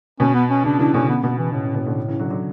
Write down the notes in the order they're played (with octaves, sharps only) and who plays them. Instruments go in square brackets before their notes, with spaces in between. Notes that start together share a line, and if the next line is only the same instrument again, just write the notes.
[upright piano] B2 [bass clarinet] C#4
[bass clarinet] B3
C#4
[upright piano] C#3 [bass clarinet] D4
[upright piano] C#3 E3 [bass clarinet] D4
[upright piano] B2 D3 [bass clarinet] C#4
[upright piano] C#3 [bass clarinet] B3
[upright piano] B2 [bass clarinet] B3
[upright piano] C#3 [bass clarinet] E3
[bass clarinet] A2 [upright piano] C#3
[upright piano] C#3
B2
B2 D3
C#3 E3
D3 F#3
D3 F#3